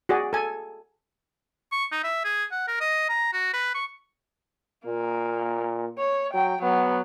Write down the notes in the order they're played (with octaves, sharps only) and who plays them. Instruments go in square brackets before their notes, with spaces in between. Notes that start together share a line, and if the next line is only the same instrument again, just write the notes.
[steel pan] F#4 G#4 D5
A4 G#5
[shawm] C#6
D#4
E5
G#4
F#5
A#4
D#5
A#5
F#4
B4
C#6
[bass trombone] A#2 [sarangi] A#3
[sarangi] C#5
[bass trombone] F#3 [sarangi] G5
[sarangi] F#3 [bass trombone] B3